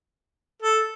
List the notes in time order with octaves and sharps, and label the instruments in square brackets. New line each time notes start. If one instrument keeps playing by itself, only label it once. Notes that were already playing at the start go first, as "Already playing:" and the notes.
[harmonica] A4